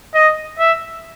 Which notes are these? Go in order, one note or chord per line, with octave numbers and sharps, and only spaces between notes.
D#5
E5